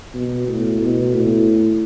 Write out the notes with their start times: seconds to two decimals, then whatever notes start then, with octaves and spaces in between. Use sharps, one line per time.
0.14 B2
0.48 A2
0.81 B2
1.14 A2